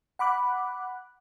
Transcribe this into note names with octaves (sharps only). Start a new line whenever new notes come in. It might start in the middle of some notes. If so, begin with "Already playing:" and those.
F#5 B5 D6 F#6